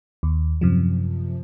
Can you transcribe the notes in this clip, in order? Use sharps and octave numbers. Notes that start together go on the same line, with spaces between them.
D#2
F#2 C3 F3